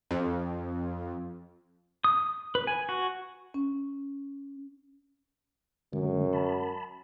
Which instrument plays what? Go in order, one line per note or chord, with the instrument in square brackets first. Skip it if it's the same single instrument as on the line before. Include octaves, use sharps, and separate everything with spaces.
[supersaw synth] F2
[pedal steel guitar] D#6
B4
G#5
F#4
[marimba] C#4
[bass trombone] F#2 [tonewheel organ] D3 G#3
[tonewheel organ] A5 B5